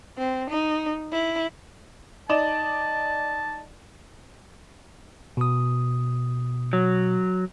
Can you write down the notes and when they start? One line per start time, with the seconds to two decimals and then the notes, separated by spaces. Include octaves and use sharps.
0.18 C4
0.50 D#4
1.11 E4
2.29 D#4 D5 A5 E7
5.37 B2 D#6
6.73 F#3